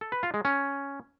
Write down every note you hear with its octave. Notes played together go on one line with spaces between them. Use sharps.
A4
B4
F4
G#3
C#4